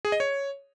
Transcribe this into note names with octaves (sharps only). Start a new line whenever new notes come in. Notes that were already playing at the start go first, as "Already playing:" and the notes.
G#4
D#5
C#5